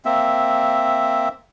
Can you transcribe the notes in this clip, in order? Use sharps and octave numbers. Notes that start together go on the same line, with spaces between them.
A#3 C4 E5